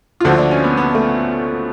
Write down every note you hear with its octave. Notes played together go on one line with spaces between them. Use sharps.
F4
D2 D3 F3 F#4
F4
D4
C#4
B3
B3
A3